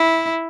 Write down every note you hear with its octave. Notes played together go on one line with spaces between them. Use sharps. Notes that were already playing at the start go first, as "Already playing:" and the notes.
Already playing: E4